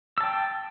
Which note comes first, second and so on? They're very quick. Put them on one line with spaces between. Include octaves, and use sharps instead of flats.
E6 A5 G5